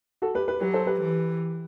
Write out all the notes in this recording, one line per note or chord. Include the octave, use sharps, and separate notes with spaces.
F#4 A4
G4 B4
G4 B4
F#3 G4 B4
A4 C5
G4 B4
E3